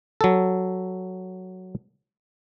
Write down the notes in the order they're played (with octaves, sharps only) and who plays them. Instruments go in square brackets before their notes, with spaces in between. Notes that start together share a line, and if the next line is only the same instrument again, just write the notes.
[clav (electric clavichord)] F#3 A4